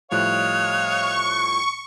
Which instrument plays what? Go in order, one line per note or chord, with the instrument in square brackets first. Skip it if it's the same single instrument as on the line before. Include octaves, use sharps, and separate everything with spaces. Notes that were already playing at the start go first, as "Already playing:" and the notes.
[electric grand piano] A2 F3 G3 [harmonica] C#5 D#5 F5 [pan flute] F#6
[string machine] C#6